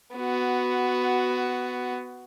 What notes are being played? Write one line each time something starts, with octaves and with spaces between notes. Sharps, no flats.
B3 F#4